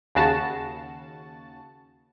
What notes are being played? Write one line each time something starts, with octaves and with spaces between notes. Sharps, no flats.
D#2 C#3 F#4 A5